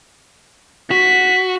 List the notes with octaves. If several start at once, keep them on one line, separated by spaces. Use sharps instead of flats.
F#4 B6